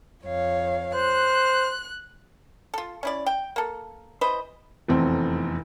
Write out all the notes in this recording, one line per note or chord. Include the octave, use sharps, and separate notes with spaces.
F2 C#5 F5
C5 F#6
F4 A4
C#4 E4 D5
G5
A#3 A4
E3 B4 C5 D#5
F1 E2 A3 C4